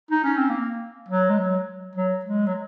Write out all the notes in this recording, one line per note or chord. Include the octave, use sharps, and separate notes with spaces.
D#4
C#4
C4
A#3
F#3
G#3
F#3
F#3
G#3
F#3